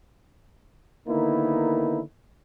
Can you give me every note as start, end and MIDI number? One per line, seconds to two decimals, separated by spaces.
1.08 2.01 50
1.08 2.01 51
1.08 2.01 58
1.08 2.01 59
1.08 2.01 63
1.08 2.01 64